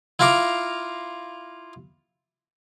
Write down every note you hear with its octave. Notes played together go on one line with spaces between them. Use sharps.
E4 F4 F5 A#5 D6